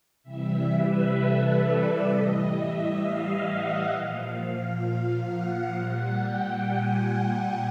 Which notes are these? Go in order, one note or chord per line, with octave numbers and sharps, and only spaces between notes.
C3 E3 G3 E5
B4
A4
D5
A2 E3 G3 D#5
E5
F5
F#5
A#2 F3 F5
F5
F#5
A#2 G3 F#5
G5
G#5